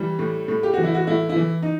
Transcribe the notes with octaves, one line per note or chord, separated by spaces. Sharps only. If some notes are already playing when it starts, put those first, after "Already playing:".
Already playing: E3 G3
A2
A2
G4
E3 F#4
E4
F#4
A2 E4
E4
E3
D#4